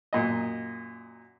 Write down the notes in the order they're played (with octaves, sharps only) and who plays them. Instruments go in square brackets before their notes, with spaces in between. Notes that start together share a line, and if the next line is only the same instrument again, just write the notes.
[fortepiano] F#2 A#2 D#5